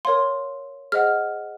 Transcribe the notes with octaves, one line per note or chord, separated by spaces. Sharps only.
A#4 C#5 F5 C6
G#4 C5 D#5 F#5 F6